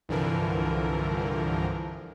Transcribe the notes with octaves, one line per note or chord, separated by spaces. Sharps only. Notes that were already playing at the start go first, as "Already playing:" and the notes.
C2 G2 D3 E3 F3 A#4